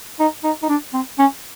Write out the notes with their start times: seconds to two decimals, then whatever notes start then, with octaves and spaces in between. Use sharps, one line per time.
0.19 D#4
0.44 D#4
0.63 D#4
0.69 D4
0.93 C4
1.19 C#4